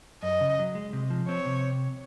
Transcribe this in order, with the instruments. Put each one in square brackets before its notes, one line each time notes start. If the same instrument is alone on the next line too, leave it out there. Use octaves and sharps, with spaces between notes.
[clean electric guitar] F#2 [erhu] D#5
[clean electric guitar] C#3
F#3
G#3
C3
F3
[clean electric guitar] C4 [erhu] C#5
[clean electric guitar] C3